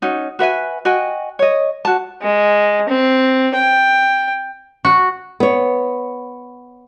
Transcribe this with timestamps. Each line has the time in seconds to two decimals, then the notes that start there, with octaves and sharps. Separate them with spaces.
0.02 C#4 D#4 F#4
0.39 F#4 B4 E5 G#5
0.85 F#4 D#5 G5 G#5
1.39 C#5 D#5
1.85 F#4 A5
2.22 G#3
2.89 C4
3.55 G5
4.85 F#4
5.40 B3 C#5